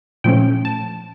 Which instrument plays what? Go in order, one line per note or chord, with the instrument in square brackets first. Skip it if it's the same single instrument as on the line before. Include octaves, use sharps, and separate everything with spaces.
[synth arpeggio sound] A#2 F3 A3 C#4 G5
A5